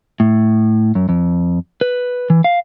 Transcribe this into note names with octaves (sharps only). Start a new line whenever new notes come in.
A2
F#2
F2
B4
E3
F5